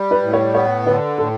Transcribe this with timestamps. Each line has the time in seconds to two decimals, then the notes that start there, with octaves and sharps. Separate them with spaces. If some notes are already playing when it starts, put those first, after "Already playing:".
Already playing: G3
0.11 B4
0.22 A2
0.33 C#5
0.54 B3 C#5
0.86 D3 B4
1.18 A2 A4